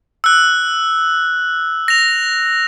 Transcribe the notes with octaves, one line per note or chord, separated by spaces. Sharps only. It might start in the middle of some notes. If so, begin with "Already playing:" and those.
E6 F#6
A#6 F7